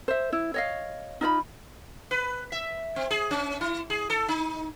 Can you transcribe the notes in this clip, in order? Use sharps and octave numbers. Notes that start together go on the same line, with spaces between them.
C5 E5
E4
C#5 D#5 F5
D#4 F4 D#5 B5
B4
E5
C4
G#4
C#4
E4
G#4
A4
D#4